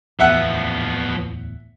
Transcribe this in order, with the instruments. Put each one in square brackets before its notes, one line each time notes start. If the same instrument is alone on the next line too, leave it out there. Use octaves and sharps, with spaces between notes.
[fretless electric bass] D1 E2 A2 [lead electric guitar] F3 B3 [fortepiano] E5 F#5 F#6